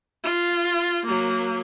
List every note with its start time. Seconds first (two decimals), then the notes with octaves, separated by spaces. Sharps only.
0.23 F4
1.06 F#3 A#3